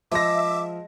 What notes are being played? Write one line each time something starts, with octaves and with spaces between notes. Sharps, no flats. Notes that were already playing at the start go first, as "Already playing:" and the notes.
F3 G#3 E5 D6 A#6